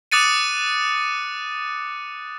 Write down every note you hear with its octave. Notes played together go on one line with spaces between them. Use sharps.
D6 D#6 F#6 A6 C#7 D#7